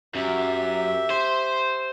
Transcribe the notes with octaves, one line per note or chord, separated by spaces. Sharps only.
F#2 G4 E5
C5